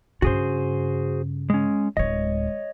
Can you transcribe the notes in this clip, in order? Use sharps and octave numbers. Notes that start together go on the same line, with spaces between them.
G2 C#3 F#4 G#4 C5
G#3 C#4
D1 G#3 C#5 D#5